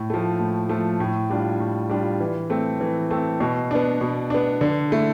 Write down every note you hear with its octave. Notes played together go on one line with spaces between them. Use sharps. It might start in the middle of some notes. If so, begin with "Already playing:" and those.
Already playing: A2
F3 A3
A2
F3 A3
A2
G3 D4 F4
A2
G3 D4 F4
E3
A3 C4
E3
A3 C4
B2
B3 D4
B2
B3 D4
D3
A3 E4